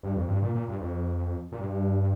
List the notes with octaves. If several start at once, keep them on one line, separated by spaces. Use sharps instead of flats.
G2
F2
G2
A#2
A#2
G2
F2
A#2
G2